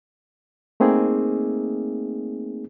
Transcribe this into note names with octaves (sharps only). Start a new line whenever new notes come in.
A3 A#3 C4 D#4 G#4